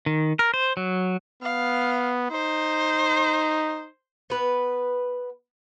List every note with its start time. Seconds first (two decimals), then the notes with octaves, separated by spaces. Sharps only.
0.06 D#3
0.39 A#4
0.54 C5
0.77 F#3
1.43 B3 F5
2.31 D#4 C5
4.30 B3 B4